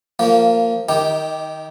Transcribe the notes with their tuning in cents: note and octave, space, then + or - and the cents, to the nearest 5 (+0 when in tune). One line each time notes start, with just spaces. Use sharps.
F3 +0 A#3 -20 F4 +0
D#3 -5 D#4 +25 G4 +0